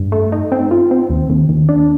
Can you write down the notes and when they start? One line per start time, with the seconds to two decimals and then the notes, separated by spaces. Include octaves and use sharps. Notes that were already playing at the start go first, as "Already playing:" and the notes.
Already playing: G2
0.12 A3
0.32 D#4
0.52 C4
0.71 F4
0.91 C4
1.10 D#2
1.29 D#2
1.49 D#2
1.69 D4